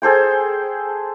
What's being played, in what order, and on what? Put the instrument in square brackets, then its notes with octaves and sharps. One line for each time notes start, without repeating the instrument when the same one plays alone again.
[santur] G#4 A4 C5 G5